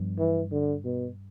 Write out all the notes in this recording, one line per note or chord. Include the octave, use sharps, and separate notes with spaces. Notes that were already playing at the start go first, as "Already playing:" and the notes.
Already playing: G2 F3 B3
E3
D3
B2